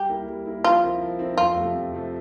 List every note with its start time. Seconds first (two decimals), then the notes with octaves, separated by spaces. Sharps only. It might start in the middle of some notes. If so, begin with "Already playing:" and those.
Already playing: G3 G4
0.09 A#3 E4 A#4
0.27 G3
0.46 A#3 E4 A#4
0.64 F3 F4
0.83 C4 E4 A#4
1.01 F3
1.19 C4 E4 A#4
1.38 F2 F4
1.57 C3 F3 A3
1.75 F2
1.93 C3 F3 A3